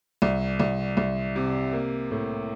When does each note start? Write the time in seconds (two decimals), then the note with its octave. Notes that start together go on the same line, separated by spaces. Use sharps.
0.22 C2
0.60 C2
0.97 C2
1.36 C3
1.72 A#3
2.11 A2